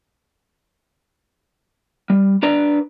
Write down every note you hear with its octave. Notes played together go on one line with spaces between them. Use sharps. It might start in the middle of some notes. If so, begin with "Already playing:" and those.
G3
D4 B4 D5 A#5